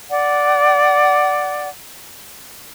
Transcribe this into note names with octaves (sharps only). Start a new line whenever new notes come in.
D5 F#5